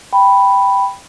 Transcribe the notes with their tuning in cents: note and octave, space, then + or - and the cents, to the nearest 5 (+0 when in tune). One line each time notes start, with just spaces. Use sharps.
G5 +0 B5 +0